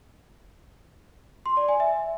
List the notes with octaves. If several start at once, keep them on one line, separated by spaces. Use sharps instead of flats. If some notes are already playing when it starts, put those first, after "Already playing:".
C6
D5
G#5
E5